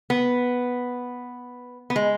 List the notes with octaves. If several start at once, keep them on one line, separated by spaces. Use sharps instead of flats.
B3
B3
G#3